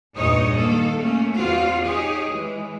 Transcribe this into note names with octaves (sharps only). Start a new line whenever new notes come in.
E2 G2 A#2 D#4 C#5 D#5
D#3 A#3 A4
A3 A#3 C#4
E2 C4 F4 F#4 F5
D#4 G4 G#4 C#5
E3 G#3